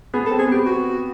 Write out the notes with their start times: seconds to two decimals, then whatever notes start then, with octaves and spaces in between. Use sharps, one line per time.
0.14 B3 G#4
0.26 A4
0.31 C4
0.39 G#4
0.47 B3 G4
0.66 F#4